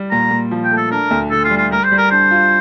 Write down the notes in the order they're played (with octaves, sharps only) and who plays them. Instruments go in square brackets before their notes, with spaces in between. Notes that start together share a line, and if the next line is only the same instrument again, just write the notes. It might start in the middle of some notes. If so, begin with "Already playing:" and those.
Already playing: [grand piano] G3
[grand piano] A#2 [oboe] A#5
[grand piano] A#2
F3
[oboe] G5
[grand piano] A3
[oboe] A4
[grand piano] D4 [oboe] A#4
[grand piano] D2
[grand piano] D3 [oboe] A4
[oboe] F4
[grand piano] G3
[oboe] F4
[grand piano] G3 [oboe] A#4
[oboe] C5
[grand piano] G3
[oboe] A#4
[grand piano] D4 [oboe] C5
[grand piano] F4